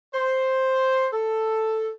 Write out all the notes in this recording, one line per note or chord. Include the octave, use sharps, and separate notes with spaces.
C5
A4